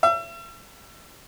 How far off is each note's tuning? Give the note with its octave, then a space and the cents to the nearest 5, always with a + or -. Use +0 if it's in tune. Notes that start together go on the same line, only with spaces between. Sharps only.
E5 +35